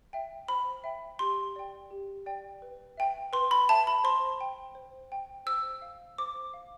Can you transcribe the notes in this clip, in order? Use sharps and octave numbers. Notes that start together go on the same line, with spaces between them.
E5 G5
C5 B5
E5 G5
G4 C6
D5 G5
G4
D5 G5
B4
E5 G5
B4 C6
B5
E5 G5 A5
B5
C5 C6
G5
C5
G5
C5 E6
F5
C5 D6
F5